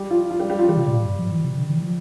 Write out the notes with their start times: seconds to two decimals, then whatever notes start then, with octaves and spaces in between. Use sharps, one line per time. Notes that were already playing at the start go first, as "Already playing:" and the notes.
Already playing: G3 G4
0.11 F3 F4
0.30 F3 F4
0.40 G3 G4
0.50 G3 G4
0.58 F3 F4
0.68 E3 G3 G4
0.77 C3
0.87 A#2
0.97 A2
1.06 G2
1.19 F3
1.31 E3
1.44 C3
1.57 D3
1.69 E3
1.82 F3